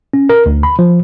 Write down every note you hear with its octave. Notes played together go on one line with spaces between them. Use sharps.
C#4
A#4
D2
B5
F3